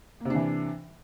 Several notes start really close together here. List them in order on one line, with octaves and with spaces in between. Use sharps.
A#3 C3 D4 E3